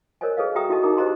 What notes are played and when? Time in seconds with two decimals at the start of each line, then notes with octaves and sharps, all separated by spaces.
0.21 A#4 C5 C#5 D#5 G#5
0.37 G#4 A4 B4 C#5 D#5 F5
0.55 F#4 G#4 E5 G5 A#5 D#6
0.69 E4 F#4 A4 D#5 A5 C#6
0.83 D#4 A#4 A#5 D6 D#6
0.97 G4 B4 C5 D#5 A#5 C6